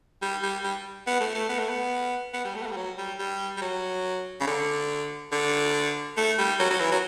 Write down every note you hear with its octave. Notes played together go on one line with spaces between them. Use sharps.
G3
G3
G3
B3
A3
A3
B3
A3
B3
B3
G3
A3
B3
A3
G3
F#3
G3
G3
G3
F#3
C#3
D3
D3
A3
G3
F#3
F#3
E3
F#3